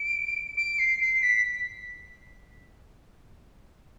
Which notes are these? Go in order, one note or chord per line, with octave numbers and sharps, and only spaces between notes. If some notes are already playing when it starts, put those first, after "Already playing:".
Already playing: D7
D7
C7
C7
B6